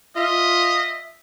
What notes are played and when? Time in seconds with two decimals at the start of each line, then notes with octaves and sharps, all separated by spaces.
0.16 F4 D#5 E5